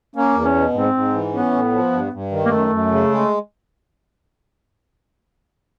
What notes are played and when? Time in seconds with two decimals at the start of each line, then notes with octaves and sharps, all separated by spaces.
0.15 A#3 C#4
0.35 E2
0.45 C#4
0.55 B2
0.74 G#2 C4
0.94 G#2
1.14 E3
1.33 B3 C#4
1.53 A2
1.73 F3
1.93 G2
2.13 G2
2.32 D#3
2.46 A#3
2.51 F#2 A3
2.71 F#2
2.91 C#3
3.11 G#3